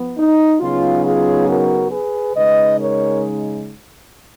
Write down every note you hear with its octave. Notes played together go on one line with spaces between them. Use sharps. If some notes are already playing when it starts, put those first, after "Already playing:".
Already playing: F3 B3
D#4
C#3 F#3 B3 D#4 F4
F4 G#4
F#4 A#4
G#4 B4
C#3 G#3 D#4 B4 D#5
A#4 C#5